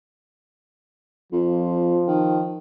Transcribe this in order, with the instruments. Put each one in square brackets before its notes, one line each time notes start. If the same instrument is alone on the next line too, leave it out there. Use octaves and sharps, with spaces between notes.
[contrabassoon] F2 [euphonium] F3
[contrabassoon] D#3